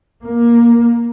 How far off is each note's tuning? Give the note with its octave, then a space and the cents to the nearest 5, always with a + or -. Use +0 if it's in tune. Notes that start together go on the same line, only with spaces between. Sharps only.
A#3 +15